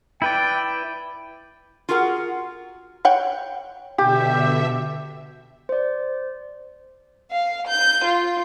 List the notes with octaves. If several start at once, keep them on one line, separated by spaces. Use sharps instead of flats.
E4 B4 D5 G5
F4 F#4 G#4 A#4 F#5
C#5 F#5 G5
B2 D3 G4 E5
C5 D5
F5
G6
F4